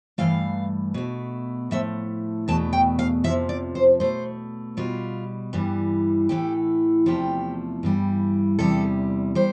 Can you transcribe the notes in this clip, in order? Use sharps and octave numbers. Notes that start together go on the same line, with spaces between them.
G2 E3 A3 F5
B2 A3
A2 F3 A3 E5
E2 B2 A3 A5
G5
F5
F2 C3 F3 E5
D5
C5
B2 A3 C5
B2 G3 F4
G2 E3 G3
A2 E3 A3 G4
E2 C3 F3 A3 G4
G2 E3 G3
E2 C3 G3 A4
G3 C5